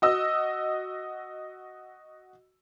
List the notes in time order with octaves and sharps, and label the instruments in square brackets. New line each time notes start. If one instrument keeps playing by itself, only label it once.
[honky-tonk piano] F#4 D#5 E6